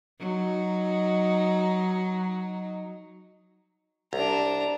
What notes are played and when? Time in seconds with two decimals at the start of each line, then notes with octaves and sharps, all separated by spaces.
0.19 F#3 D#4
4.13 C2 D4 A#5